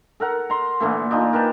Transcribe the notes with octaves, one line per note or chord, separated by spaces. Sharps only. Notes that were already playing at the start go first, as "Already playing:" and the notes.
A4 A#4 F#5
A#5 C6
A#2 D3 E3 A3
D4 D#4 F4 G#5
A#4 B4 G5 A5